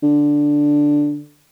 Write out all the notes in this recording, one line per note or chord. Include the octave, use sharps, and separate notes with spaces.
D3